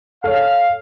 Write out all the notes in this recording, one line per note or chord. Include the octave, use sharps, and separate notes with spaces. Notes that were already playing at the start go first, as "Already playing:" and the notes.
A4 C#5 F5